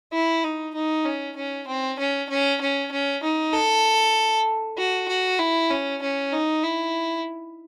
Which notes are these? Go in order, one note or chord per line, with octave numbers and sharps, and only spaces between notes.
E4
D#4
D#4
C#4
C#4
C4
C#4
C#4
C#4
C#4
D#4
A4
F#4
F#4
E4
C#4
C#4
D#4
E4